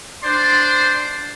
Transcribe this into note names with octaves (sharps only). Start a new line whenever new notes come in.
D4 C5 D5 C6